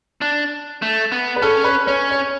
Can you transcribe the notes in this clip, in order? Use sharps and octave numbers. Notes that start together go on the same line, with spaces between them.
D4
A3
B3
B4
C#4 A4
B4
C#4 C#5
C#5